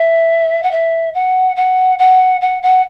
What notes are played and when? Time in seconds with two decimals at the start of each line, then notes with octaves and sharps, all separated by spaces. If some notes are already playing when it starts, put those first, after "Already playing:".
Already playing: E5
0.62 F#5
0.71 E5
1.14 F#5
1.55 F#5
1.98 F#5
2.40 F#5
2.62 F#5